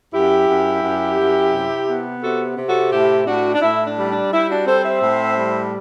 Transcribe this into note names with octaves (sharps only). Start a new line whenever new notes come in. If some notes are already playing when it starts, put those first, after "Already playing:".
F#2 E4 G4
F#2
F#2
F#2
C3
B3
C3 F#4 A4
C3
F#4 A4
A2 E4 G4
A2 D4 F#4
D4
A2 E4
D4
G3
D4
G3 E4
D4 F#4
C4 A4 C5
C5 E5
A2
G3